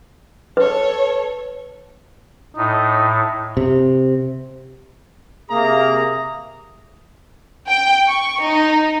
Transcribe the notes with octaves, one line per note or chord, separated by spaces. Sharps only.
A4 B4 C#5
A2 D#4
C3
C3 A#3 G#4 A#5
G5
C#6
D#4